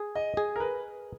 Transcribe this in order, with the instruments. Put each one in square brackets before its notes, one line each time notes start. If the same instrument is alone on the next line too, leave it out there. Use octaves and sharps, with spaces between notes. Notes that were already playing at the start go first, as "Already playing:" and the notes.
Already playing: [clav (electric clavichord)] G#4
[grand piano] D#5
[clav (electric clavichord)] G#4
[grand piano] A#4
B4